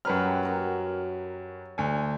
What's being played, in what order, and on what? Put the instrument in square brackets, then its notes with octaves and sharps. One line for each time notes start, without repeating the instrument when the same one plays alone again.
[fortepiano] F#2 B4 F6 [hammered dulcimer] F#3 G3 G4
[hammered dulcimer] F#4 A#4 D#5
[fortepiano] D2 G#5